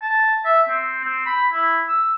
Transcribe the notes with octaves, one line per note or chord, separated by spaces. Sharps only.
A5
E5
C4
C4
B5
E4
E6